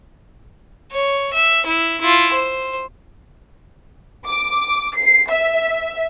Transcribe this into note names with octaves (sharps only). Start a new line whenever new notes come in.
C#5
E5
E4
E4 F4
C5
D6
C7
E5